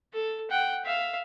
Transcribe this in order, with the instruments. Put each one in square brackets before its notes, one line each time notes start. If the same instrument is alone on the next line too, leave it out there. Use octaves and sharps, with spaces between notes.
[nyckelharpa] A4
F#5 G5
E5 F5